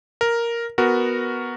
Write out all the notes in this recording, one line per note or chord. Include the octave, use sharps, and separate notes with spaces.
A#4
B3 F#4 A#4